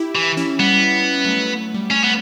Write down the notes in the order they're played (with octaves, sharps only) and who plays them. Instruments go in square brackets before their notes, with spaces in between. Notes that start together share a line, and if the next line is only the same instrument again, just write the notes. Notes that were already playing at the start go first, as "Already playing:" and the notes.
Already playing: [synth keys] E4 G4
[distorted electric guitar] E3
[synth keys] C#4 E4
[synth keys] G3 [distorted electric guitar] B3
[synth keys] F#3 A3
G3
[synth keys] F#3 [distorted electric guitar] C#4
[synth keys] F#3 [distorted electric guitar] B3